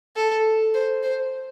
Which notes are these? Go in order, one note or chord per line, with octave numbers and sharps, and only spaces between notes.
A4
C5
C5